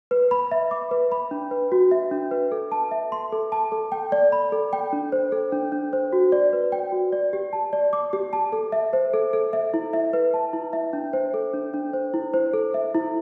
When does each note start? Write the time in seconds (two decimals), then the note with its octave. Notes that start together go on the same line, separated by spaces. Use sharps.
0.11 B4
0.31 B5
0.51 E5
0.71 D6
0.91 B4
1.12 B5
1.31 D4
1.51 B4
1.72 F#4
1.91 E5
2.11 D4
2.31 B4
2.52 A4
2.72 A5
2.91 E5
3.12 C6
3.32 A4
3.52 A5
3.72 A4
3.92 G5
4.12 D5
4.32 B5
4.52 A4
4.73 G5
4.93 D4
5.12 C5
5.32 A4
5.52 D4
5.72 D4
5.93 C5
6.13 F#4
6.32 D5
6.53 B4
6.72 G5
6.92 F#4
7.13 D5
7.33 G4
7.53 A5
7.73 D5
7.93 D6
8.13 G4
8.33 A5
8.52 A4
8.72 E5
8.93 C5
9.14 A4
9.33 A4
9.53 E5
9.74 E4
9.93 E5
10.13 B4
10.34 A5
10.53 E4
10.73 E5
10.93 D4
11.13 C5
11.34 A4
11.54 D4
11.73 D4
11.93 C5
12.14 E4
12.34 C5
12.53 A4
12.74 E5
12.95 E4